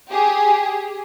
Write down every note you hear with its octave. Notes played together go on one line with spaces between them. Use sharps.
G4 G#4